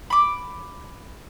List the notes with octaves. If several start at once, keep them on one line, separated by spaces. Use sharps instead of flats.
B5 D6